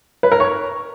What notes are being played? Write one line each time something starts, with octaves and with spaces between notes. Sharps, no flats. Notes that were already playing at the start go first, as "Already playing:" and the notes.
B4
A#4
C#5